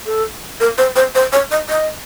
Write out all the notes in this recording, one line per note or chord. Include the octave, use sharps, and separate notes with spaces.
A4
A#4
C5
C5
C5
C#5
D#5
D#5